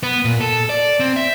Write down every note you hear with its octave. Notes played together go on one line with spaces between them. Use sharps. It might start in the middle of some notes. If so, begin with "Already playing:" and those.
B3
A#2
A4
D5
C4
E5